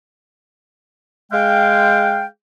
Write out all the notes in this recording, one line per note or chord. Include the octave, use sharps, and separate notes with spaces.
G#3 F5 G5